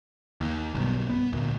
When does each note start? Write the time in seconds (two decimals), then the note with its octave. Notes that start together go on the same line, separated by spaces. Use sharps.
0.41 D#2
0.75 B1 G2 B2
1.09 B3
1.32 D2 A#2